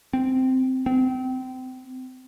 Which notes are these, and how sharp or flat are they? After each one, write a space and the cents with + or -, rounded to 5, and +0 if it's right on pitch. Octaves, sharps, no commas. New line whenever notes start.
C4 -10
C4 -30